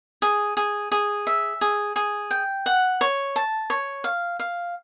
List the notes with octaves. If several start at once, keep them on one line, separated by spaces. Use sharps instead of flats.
G#4
G#4
G#4
E5
G#4
G#4
G5
F#5
C#5
A5
C#5
F5
F5